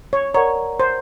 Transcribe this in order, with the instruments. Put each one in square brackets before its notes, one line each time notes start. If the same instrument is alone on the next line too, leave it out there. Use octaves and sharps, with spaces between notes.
[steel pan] C#5
[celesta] A#4 D5 F#5 A#5 [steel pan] C#5
[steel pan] C5